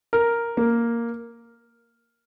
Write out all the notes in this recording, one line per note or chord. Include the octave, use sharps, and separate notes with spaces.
A#4
A#3